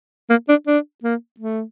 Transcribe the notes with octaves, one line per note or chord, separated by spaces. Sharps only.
A#3
D4
D4
A#3
A3